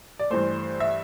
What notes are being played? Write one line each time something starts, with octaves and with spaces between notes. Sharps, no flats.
D5
G2 E3 A3 C5
E5